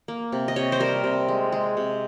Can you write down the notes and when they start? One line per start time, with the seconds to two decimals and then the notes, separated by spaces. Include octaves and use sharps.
0.08 A#3
0.32 C3
0.48 D#5
0.56 C3 C#5
0.72 C5
0.80 G3 A#4
1.04 C3
1.28 G#3
1.52 G#3
1.77 C3